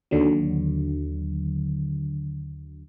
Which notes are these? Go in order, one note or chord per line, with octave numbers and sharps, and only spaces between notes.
D#2 D3 F#3